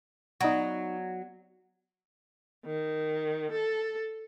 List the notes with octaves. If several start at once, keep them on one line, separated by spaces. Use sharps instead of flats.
F#3 B3 D#4 D5 A#5 C#6
D#3
A4